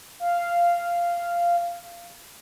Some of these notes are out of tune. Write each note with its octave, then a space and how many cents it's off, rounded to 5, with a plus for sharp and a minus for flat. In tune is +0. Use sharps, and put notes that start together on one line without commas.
F5 -10